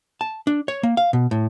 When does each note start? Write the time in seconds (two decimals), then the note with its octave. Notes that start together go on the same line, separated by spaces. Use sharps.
0.21 A5
0.47 D4
0.68 C#5
0.83 A#3
0.97 F5
1.13 B2
1.31 A2